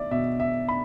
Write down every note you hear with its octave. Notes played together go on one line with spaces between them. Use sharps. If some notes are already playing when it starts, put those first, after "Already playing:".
Already playing: B2 D5 E5
B2 E5
E5
B5